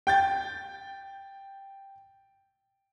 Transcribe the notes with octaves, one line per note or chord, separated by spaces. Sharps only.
G5 G6 A6